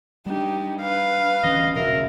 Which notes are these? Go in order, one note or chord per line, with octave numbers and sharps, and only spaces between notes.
G3 D4 D#4 G4
B4 F5
D1 E3 C#4 D#5
D#1 B1 C#3 F#3 A#4 E5